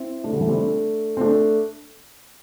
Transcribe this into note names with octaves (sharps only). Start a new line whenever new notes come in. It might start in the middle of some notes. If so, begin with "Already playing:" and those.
Already playing: C4 E4
A3 D4
D3 G3
E3 A3
G3 C4
A3 D4
C4
A3 D4